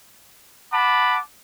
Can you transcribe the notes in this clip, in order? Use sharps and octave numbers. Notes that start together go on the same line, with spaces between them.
F#5 A5 B5 D6